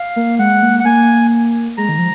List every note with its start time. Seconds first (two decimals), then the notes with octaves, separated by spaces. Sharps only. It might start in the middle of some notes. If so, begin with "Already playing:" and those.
Already playing: F5
0.16 A#3
0.39 G#3 F#5
0.63 A#3
0.79 F#5
0.85 A#3 G#5
1.78 G#3 A#5
1.89 D#3
1.98 F3